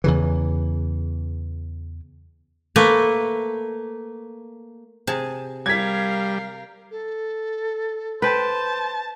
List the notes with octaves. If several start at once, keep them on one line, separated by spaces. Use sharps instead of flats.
E2 C#3 E3
A3 A#3 B4
C3 G#4 A5
G3 A#4 F5 G#6 B6
A4
B4 C5 G5 A5